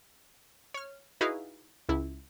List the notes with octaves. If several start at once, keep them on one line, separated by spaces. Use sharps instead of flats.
C#5 F6
D#4 E4 F#4 G#4 B4 F5
C#2 E4